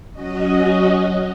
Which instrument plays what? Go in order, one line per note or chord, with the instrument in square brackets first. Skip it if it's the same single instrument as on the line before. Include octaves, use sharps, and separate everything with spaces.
[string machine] F#3 C#4 F#4 D#5